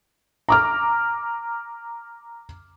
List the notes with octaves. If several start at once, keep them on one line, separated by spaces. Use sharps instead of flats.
A#5 D6 F6